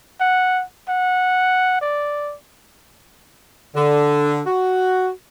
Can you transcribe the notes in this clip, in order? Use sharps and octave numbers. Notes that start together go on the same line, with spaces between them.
F#5
F#5
D5
D3
F#4